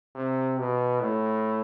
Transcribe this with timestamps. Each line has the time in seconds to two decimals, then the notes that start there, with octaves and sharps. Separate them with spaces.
0.15 C3
0.59 B2
1.01 A2